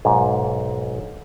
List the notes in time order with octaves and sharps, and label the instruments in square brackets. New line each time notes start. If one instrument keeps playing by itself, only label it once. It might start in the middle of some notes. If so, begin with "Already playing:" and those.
[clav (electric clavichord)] B1 G#2